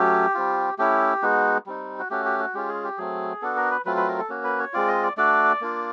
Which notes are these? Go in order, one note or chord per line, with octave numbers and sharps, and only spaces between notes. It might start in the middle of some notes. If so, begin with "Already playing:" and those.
Already playing: F#3 A3 C#4 G4
G3 C4 F4
A3 C#4 E4 G4
G#3 B3 D#4 F#4
G3 C4 D#4
F#4
A3 C#4 F#4 G4
G4
F#4
G#3 C#4 F4 G4
G#4
G4
F#3 A3 C4 G#4
B3 D4 F#4 A4
A#4
B4
F#3 A3 C4 F4 B4
B4
A#4
A4
A#3 C#4 F#4
B4
C#5
G#3 C4 F4 D5
D#5
D5
A3 D4 F#4 D5
A#3 D4 F4